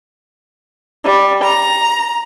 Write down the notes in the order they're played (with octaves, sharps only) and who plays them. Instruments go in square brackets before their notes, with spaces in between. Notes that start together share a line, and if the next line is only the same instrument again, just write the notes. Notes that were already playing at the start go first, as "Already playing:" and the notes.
[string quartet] G3
A#5